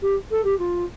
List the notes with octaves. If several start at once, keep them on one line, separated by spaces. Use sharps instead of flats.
G4
A4
G4
F4